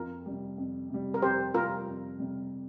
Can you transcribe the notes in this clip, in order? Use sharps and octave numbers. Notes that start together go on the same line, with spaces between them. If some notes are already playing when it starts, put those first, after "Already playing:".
Already playing: F2 F4 A#4
C3 G3
F2
C3 G3
A#4
F2 G4 C5
C3 G3 F4 A#4
F2
C3 G3